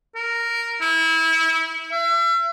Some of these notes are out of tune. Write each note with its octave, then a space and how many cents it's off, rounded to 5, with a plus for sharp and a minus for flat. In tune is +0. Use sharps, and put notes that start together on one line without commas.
A#4 -5
E4 -25
E5 +40